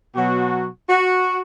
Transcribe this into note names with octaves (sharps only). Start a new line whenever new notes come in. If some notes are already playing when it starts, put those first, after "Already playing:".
B2 F#3 F#4
F#4